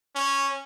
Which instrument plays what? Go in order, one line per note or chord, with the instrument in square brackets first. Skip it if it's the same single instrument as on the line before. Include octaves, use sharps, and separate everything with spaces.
[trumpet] C#4